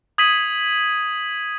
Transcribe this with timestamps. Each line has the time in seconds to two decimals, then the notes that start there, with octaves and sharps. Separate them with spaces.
0.18 D#6 G#6 B6 D#7 F#7